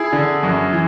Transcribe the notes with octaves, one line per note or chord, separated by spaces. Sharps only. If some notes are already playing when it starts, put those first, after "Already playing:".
Already playing: E4 G#4
D3
F#2
E3